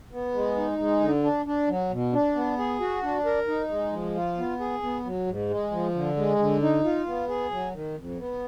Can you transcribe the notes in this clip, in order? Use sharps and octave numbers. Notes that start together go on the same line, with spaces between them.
B3
G#3
D#4
G#3
D3
D4
D4
F#3
B2
D4
B3
G#4
F#4
D4
A#4
D#4
G#3
F3
F4
B3
G#4
B3
F#3
G#2
G#3
F3
D3
G#3
D3
D#4
F4
B3
G#4
F#3
D#3
F2
B3